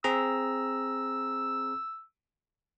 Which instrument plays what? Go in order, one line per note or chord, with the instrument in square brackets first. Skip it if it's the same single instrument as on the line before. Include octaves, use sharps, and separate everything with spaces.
[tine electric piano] C4 G#4 A#5 [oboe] E6